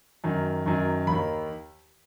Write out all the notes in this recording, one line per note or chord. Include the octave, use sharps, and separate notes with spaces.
F#2 D#3
F#2 D#3
D#2 D#3 B5